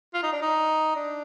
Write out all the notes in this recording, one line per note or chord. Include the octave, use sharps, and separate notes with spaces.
F4
D#4
D4
D#4
D4